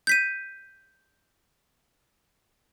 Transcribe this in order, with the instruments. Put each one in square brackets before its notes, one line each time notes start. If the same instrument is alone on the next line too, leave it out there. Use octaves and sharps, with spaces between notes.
[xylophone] G6 B6 D#7